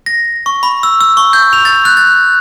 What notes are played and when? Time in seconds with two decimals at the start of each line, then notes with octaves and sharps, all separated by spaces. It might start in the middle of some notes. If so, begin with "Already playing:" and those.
0.06 A#6
0.46 C#6
0.63 B5
0.83 E6
1.01 E6
1.17 C#6
1.33 G6
1.53 F7
1.65 A6
1.85 F#6
1.97 A6